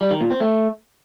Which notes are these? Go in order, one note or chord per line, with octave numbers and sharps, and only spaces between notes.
G3
D#3
A#2
C4
A3